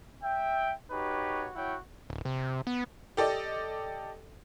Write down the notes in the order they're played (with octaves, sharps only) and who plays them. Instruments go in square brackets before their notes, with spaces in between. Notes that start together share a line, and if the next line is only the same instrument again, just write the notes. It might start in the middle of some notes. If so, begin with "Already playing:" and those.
[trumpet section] E5 G5
D#4 F#4 G4 B4 C#5
E4 F#4 C#5 F#5 G5
[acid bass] D1
C3
B3
[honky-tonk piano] G4 A4 D5 D#5